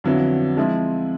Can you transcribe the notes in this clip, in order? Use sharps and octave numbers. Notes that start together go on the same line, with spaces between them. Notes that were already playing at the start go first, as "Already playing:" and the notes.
F2 D3 F#3 B3 E4
F3 G#3 C4 E4